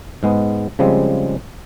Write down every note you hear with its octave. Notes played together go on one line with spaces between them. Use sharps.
G#2 G#3 B3
C#3 F3 G3 G#3 C4